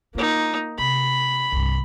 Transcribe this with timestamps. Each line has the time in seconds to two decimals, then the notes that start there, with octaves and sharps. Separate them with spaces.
0.15 A#3 D#4 F4
0.79 C3 B5
1.52 C2 G2